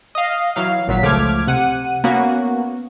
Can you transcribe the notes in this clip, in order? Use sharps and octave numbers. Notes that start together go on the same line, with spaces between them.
D#5 F5
E3 F#3 F5
G#1 A#2 F#3 B6
C#2 F3 A3 D6 F6 G#6
C3 F#5 D#7
A#3 B3 C#4 F#4